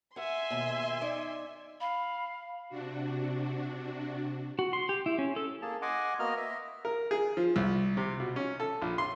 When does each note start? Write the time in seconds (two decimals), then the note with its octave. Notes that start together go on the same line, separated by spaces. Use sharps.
0.16 E5 F#5 G#5 C6
0.50 D#2 B2
1.01 D#4 D5
1.81 F5 B5
2.69 C3 D4 F#4
4.59 F#4
4.73 C6
4.89 G4
5.06 E4
5.18 C#4
5.36 A4
5.62 A#3 G#4 A5
5.82 D#5 F#5 G#5 C6 D6
6.19 A#3 B3 F#4 A#4 D#5 F6
6.37 D#5 E5
6.85 A#4
7.11 G#4
7.37 F3
7.56 C2
7.97 C3
8.20 B2
8.36 C#4
8.60 A4
8.82 A#1
8.98 C6